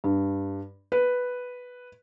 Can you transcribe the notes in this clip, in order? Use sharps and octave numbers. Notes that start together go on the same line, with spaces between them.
G2
B4